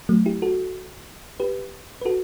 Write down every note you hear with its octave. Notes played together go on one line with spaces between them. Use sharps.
F#3 A3
E4 G4
F#4 A4
G4 B4
B4
F#4 A4